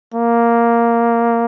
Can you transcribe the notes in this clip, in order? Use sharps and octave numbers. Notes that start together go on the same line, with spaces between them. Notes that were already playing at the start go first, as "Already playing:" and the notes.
A#3